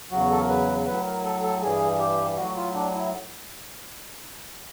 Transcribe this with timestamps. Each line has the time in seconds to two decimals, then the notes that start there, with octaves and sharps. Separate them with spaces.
0.11 E2 C#3 F#3 F#4
0.31 A4
0.39 A#4
0.49 B4
0.87 A2 F#3 B4
1.05 A#4
1.24 A4
1.43 A4
1.61 G2 E3 G3 G#4
1.99 G4
2.36 A2 F#3 F#4
2.56 F4
2.75 D4
2.94 E4